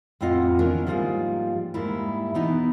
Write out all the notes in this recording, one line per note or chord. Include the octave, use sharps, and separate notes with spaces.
F2 A2 C4 F4 D#5 F#5
B3 C#4 D4 E4 A#4
G#2 F3 G3 G#3 A#3 F4
G#2 G3 A#3 E4
B2 E3 B3 D#4 E4 B4